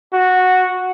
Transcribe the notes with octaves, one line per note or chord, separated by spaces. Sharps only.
F#4